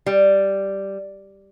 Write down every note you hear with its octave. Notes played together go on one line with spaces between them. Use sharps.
G3